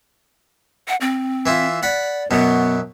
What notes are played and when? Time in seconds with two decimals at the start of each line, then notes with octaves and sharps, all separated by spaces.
0.88 F#5
1.01 C4
1.46 E3 E4 F4
1.83 D5 F#5 B5
2.31 F#2 B2 B3